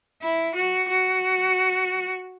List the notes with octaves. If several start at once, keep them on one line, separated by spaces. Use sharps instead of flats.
E4
F#4
F#4